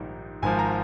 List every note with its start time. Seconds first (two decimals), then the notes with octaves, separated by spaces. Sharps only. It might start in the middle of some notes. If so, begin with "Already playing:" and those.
Already playing: A#1 G#2 D#3 G3
0.42 G#1 G#2 F3 G#5
0.59 A#5